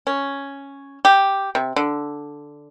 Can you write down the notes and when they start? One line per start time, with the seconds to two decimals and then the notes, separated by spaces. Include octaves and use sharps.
0.07 C#4
1.05 G4
1.55 C3
1.76 D3